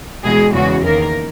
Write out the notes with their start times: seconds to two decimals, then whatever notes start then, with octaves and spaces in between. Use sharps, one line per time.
0.24 E2 B2 G#3 G#4
0.54 E2 C#3 G#3 F#4
0.83 E2 D#3 A#3 A#4